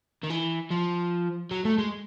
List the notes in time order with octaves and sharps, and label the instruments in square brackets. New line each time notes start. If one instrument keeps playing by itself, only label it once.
[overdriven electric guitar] D#3
E3
F3
F#3
A3
G#3